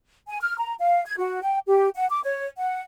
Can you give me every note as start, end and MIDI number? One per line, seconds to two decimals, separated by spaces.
0.28 0.38 80
0.41 0.57 89
0.58 0.74 82
0.79 1.03 77
1.06 1.15 92
1.18 1.40 66
1.42 1.58 79
1.67 1.89 67
1.96 2.08 78
2.09 2.20 86
2.24 2.47 73
2.57 2.82 78